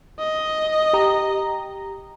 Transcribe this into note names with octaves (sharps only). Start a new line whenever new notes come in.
D#5
G4 A#5